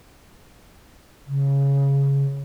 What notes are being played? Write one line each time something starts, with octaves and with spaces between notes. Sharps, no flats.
C#3